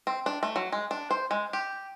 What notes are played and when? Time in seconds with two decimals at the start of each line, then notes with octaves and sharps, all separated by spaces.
0.07 C4
0.26 D4
0.43 A3
0.56 F#3
0.72 G#3
0.91 D4
1.11 C5
1.31 G#3
1.53 G4